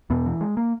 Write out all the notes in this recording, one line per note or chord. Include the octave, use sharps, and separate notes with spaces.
E2 B2 B3
E3
G#3
A#3